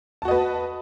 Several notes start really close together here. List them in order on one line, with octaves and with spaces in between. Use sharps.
A5 F#4 D#5 B4